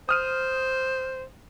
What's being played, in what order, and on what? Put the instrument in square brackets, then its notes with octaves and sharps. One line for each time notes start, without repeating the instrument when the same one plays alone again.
[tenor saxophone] C5 [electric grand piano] D#6 F6 D#7